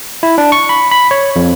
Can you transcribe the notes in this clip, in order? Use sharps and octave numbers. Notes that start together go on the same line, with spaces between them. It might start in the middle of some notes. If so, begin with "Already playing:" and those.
E4
D4
C#6
B5
B5
C#5
F2